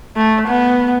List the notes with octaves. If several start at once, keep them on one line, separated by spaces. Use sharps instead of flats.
A3
B3